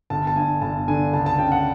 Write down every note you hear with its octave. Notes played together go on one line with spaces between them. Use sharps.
G1 A5
A5
G2 G#5
G1 A5
D3 G#5
C#2 A5
A5
C#3 G5
F#5